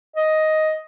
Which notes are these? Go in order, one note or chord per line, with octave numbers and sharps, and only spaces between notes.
D#5